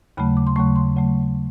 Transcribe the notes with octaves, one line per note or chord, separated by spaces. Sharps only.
D#2 C#3 F#3 A3 B5
D6
C6
D#2 C#3 F#3 A3 C#6
C6
C#3 F#3 A3